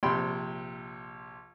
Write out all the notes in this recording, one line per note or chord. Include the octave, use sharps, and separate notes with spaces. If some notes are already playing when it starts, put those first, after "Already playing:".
A#1 C3 G5 B5 C6